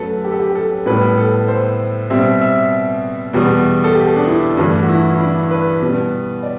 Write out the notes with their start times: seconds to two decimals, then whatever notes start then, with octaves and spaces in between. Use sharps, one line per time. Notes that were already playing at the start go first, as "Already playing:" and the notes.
Already playing: F#2 F#3 A3 A4 B4
0.24 G4
0.32 A4
0.40 G4
0.55 A4
0.86 A2 G3 B3 B4
1.17 A4
1.48 C5
2.10 B2 G3 C4 E5
2.41 E5
3.33 E2 B2 G3 B3
3.84 A4
3.95 G4
4.16 D4
4.27 E4
4.57 G2 E3 A3 D4
4.83 F#4
4.89 E4
5.11 E4
5.20 D4
5.51 B4
5.81 B2 G3 B3
6.43 D5